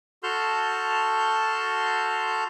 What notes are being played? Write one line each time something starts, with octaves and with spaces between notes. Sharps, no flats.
F#4 A4 A5 C6 F6 G6